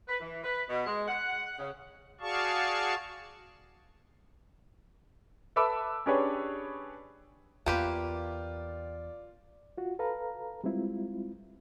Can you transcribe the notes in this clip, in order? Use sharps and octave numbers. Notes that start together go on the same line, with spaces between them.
B4
E3
B4
B2
G#3
F#5
C#3
F#4 G#4 D5 F5 A5 C#6
A4 B4 E5 B5 D6 E6
C#4 D4 G4 G#4 B4 C#5
E2 A#3 F4 G4 B4 D5
F4 F#4
A4 B4 F5 A#5
G3 G#3 C4 E4 F4